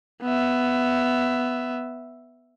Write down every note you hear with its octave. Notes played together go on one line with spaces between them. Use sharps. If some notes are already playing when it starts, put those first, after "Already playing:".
B3 E5